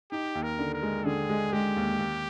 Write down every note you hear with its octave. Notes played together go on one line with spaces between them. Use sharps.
D#4 G4
D#2
A#4
D3
A#4
G#3
D3 G#4
G#3
G#3 G4
D#2
D#2